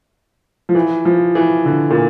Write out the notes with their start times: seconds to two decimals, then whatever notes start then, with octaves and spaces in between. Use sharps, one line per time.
0.69 F3
0.75 E3
1.05 F3
1.35 E3
1.65 D3
1.91 A#2